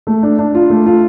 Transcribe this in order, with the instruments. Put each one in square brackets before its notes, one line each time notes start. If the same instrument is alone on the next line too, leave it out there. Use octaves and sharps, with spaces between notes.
[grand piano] A3
D4
D4
F4
A3
F4